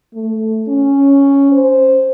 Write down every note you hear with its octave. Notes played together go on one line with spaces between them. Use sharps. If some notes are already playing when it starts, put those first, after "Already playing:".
A3
C#4
C5